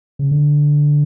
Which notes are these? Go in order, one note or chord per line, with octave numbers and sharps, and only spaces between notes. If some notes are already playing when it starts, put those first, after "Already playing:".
C#3
D3